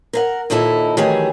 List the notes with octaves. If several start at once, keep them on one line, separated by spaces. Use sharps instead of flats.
A#4 F5 F#5
D#2 A#2 D#4 E4 A4
D#3 E3 F#3 A3 G4 G#4